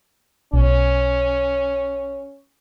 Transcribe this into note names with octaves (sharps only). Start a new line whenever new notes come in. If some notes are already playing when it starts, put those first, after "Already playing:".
B1 C#4